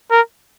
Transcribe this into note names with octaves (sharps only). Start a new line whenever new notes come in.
A#4